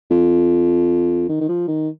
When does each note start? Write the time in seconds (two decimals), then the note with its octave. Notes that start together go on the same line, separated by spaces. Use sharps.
0.11 F2
1.29 D#3
1.41 D#3
1.49 F3
1.68 D#3